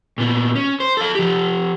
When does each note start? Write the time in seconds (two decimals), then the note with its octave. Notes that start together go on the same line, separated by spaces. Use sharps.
0.18 A#2 B3
0.56 C#4
0.80 C5
0.97 A4 F5
1.15 F3 G4